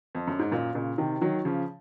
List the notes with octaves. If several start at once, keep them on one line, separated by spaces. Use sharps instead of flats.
F2
F#2
G#2
F#2 A#2
A#2 C#3
C3 D#3
D#3 F#3
C#3 F3